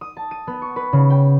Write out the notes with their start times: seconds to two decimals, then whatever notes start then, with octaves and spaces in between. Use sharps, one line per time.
0.01 D#6
0.17 A5
0.31 D#7
0.47 B3
0.62 C#6
0.76 B4
0.93 C#3
1.10 G5